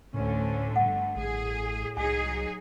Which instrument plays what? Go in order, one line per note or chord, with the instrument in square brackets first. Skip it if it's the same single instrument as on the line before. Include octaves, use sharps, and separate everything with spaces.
[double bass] D2 C#4 [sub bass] A2 [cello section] D3 A3
[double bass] G1 G2 [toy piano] F#5
[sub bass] A1 [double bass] A2 [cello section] G#4
[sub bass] C2 [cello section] F#3 D#4 G#4 [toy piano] G#5